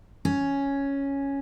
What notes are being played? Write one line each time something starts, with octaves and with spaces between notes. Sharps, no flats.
C#4